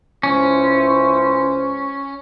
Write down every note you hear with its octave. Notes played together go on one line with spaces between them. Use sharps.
C#2 C#4 E4 C5